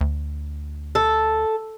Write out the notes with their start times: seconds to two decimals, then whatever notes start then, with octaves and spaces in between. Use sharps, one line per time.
0.01 D2
0.95 A4